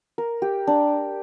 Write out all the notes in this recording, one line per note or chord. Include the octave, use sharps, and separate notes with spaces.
A#4
G4
D4